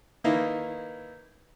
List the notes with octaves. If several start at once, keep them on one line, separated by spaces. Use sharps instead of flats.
D#3 A#3 B3 D#4 E4